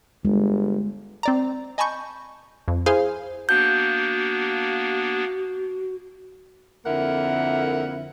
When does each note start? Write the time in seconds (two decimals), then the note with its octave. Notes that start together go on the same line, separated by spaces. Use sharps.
0.25 G1 G#3
1.23 C4 D5 A#5
1.78 D#5 G#5 A5 B5 C#6 G6
2.68 F2
2.86 E4 G#4 C5 F5 G#5
3.49 A#3 B3 D4 F#4 G6
6.86 F2 D3 A#3 E4 A#4 F#5